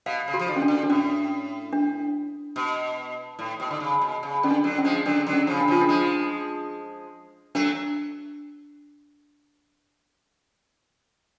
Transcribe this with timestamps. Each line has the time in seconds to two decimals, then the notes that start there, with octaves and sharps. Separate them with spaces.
0.06 B2 F5
0.28 C#3
0.34 F#4
0.39 F3
0.48 D3
0.56 C#4
0.62 D4
0.68 D3
0.83 D4
0.90 A2 C#4
1.73 D4
2.56 B2
3.39 A2
3.60 B2
3.71 D3
3.80 C#3
4.02 B2
4.23 C#3
4.43 D3 C#4
4.51 D4
4.64 D3 F#3
4.78 C#4
4.84 F3 G#3
5.06 D3 F#3 D4
5.26 D3 F#3
5.33 C#4
5.47 C#3 F3
5.61 D4
5.68 C#3 F3 F4
5.81 D4
5.89 F3 G#3
7.55 F#3 A3 D4